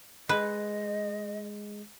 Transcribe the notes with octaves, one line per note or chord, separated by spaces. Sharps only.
G#3 B4 D#5